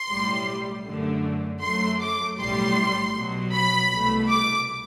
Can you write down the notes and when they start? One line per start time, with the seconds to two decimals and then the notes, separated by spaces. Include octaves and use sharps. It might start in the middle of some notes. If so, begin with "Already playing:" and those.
Already playing: C6
0.09 B1 A2 G3
0.86 F#2 D3 A3
1.61 F#2 F#3 A3 C6
2.00 D6
2.38 B1 A2 G3 C6
3.14 B1 B2 F#3
3.53 B5
3.91 C2 B2 A3
4.29 D6